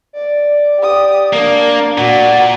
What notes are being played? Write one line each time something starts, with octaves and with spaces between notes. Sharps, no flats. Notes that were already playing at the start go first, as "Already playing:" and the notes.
D5
G4 D#6
A#3 D4 A#4
A#2 F#4